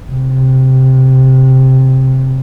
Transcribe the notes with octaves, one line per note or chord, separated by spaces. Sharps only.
C3